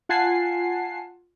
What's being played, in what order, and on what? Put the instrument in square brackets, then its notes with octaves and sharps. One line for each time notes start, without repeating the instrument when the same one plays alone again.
[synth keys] F4 F#5 G#5 A5 C7